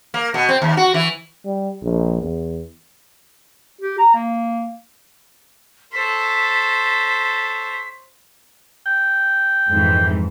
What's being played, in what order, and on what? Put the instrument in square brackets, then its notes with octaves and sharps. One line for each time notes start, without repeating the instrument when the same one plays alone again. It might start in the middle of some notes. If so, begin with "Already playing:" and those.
[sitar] A#3
B2
C4
D#2
F#4
E3
[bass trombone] G3
A#1
E2
[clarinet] G4
A#5
A#3
[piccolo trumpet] A4 [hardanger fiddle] C5 C#5 [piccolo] B6
[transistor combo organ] G5
[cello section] F2 G#2 E3